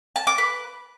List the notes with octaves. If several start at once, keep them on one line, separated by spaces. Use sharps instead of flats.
A5
D6
B4